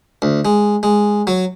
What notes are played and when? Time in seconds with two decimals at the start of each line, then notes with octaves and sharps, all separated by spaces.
0.22 D2
0.45 G#3
0.83 G#3
1.27 F#3